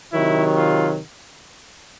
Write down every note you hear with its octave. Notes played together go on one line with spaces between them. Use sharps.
C3 D#3 F#3 E4
F4